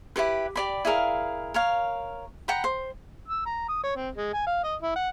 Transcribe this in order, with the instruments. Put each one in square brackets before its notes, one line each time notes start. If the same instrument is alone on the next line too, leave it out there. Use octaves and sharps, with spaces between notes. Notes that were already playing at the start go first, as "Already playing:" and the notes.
[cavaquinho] E4 F4 G4 B4
G4 D5 B5
E4 G#4 A#4 F5
A#4 C#5 F5
F#5 G5 A#5 B5
C5
[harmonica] E6
A#5
D#6
C#5
C4
G#3
G#5
F5
D#5
E4
F#5